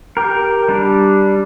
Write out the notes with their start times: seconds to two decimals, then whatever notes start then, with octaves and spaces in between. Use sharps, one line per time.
0.17 G4 A#4
0.69 G3 D4